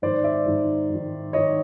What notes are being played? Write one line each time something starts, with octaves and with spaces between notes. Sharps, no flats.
G#2 D#3 C5 D5
D5 E5
G#2 D#3
G#2 D#3
G#2 D#3 C#5 D#5